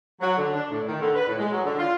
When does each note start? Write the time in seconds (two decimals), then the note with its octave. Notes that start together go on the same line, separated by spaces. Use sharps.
0.21 F#3
0.37 D3
0.53 D4
0.70 A2
0.87 D#3
1.01 D3
1.15 B4
1.27 A2
1.39 G#3
1.51 F#3
1.65 D3
1.78 F4